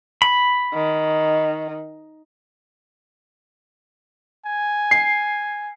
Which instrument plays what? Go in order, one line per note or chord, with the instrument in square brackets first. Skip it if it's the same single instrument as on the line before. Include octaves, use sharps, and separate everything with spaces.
[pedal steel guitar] B5
[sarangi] D#3
[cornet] G#5
[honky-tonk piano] C7